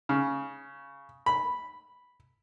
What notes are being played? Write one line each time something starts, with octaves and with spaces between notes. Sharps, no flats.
C#3
B5